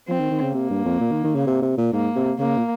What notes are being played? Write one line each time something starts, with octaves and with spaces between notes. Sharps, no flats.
F3 C4
D#3
D#3
C#3
C3 A#3
G2
F2
A#2
D#3
D#3
C#3
C3
C3
A#2
G#2 A#3
C3
C#3 A#3
A#2